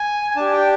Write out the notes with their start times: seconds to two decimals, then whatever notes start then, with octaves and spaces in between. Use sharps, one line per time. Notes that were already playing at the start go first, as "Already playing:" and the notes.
Already playing: G#5
0.31 G#5
0.36 D4 G4 A5
0.53 G5